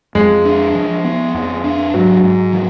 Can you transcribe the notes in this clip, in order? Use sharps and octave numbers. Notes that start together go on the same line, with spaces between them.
F2 G#3
D4
F3
B3
F2
D4
G#2 F#3
G#2
F3